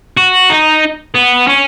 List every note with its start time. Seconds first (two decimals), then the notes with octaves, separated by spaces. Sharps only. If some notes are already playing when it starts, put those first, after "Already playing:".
0.17 F#4
0.50 D#4
1.14 B3
1.47 C#4